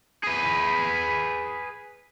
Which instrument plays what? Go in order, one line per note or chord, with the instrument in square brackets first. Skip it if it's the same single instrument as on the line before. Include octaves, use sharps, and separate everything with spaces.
[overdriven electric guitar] G#4 B4